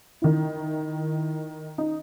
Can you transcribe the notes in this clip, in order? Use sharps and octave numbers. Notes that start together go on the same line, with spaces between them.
D#3 E4
D#4